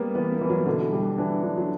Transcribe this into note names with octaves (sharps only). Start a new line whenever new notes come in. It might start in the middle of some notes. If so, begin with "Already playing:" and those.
Already playing: G3 A#3 B3
E3 B3
A#3
E3
F#3
B2 D3
G3
E3 D4
F#3 D4
F#3